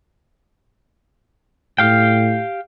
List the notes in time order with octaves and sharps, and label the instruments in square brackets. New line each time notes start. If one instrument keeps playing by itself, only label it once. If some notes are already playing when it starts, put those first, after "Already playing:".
[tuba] A2 [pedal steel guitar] G4 F5 G5